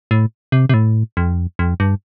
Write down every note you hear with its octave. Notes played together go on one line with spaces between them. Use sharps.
A2
C3
C3
A2
F2
F2
G2